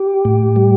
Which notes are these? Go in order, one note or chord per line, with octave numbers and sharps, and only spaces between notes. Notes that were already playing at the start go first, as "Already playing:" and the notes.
Already playing: G4
A2
G3